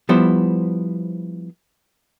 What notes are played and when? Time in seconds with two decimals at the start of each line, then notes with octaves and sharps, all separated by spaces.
0.09 F3 G3 B3 E4 C5